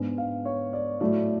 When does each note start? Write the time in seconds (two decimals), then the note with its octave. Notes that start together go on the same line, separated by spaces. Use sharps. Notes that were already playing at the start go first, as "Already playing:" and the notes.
Already playing: G#2 G#3 B3 D4
0.18 F5
0.45 C#5
0.73 D5
1.01 A2 F#3 A3 D5